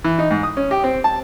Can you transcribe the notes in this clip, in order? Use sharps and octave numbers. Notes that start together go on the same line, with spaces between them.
E3
D#4
G#2
D#6
C#4
G4
C4
A5